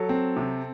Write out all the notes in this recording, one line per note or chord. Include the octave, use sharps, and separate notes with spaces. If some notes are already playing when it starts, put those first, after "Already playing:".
Already playing: F#3 A4
C4
C3